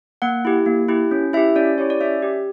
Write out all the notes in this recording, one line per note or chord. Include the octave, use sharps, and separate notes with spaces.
A#3 F#5
E4 G4
A#3
E4 G4
C#4
E4 G4 E5
C#4 D5
E4 G4 C#5
D5
C#4 E5
G4